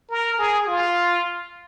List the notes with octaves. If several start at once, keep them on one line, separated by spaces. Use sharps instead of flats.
A#4
G#4
F4